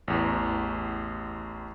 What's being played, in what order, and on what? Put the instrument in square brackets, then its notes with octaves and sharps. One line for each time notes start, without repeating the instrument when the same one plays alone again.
[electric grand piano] A1 E2